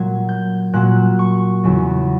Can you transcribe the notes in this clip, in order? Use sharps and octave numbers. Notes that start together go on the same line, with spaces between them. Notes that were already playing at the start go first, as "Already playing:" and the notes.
Already playing: A#2 F#3 G#6
G6
A#2 F#3 F#6
C#6
E2 C#3 F#3